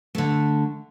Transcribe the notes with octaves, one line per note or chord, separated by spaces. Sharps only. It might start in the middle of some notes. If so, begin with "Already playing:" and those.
D3 A3